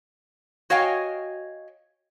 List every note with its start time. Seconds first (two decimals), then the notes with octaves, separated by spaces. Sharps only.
0.70 F#4 C#5 D#5 F5 G5 G#5